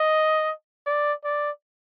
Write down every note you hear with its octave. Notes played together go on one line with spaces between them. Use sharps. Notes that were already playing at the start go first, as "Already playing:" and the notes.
Already playing: D#5
D5
D5